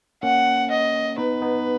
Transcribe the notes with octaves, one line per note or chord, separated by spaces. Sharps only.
A#3 C#4 F#5
D#5
B3 D#4 B4
B3 D#4